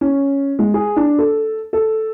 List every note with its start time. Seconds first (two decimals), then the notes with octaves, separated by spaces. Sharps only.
0.01 C#4
0.59 G#3
0.74 G#4
0.96 D4
1.18 A4
1.73 A4